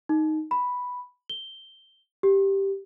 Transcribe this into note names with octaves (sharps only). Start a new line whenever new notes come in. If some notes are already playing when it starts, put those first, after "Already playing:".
D#4
B5
G7
G4